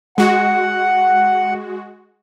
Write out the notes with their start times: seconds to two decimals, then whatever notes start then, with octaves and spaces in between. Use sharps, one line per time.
0.18 G#3 F#4 F#5